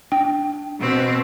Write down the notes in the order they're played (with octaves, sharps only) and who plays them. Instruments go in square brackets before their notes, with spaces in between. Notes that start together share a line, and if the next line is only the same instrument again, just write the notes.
[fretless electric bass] D4 [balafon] G5
[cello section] B2 [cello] C4